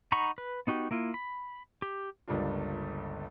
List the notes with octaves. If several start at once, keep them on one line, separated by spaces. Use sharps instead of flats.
D#4 F#5 A#5 B5 C#6
B4
B3 D#4 F#4 G4
A#3 E4 F4
B5
G4
G1 C#2 G3 A#3 D4 F4